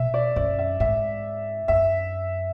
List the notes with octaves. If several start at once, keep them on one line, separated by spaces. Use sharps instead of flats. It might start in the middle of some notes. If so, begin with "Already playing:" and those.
Already playing: B2 E5
D5
F#2 D5
E5
G#2 E5
F#2 E5